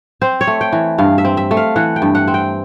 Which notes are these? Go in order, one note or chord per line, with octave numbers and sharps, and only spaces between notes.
C4 C5
C#5
A3
G5
E3
G2 F5
E5
C4
E5
A3
F5
E3 F#5
G5
G2
F#5
C4
G5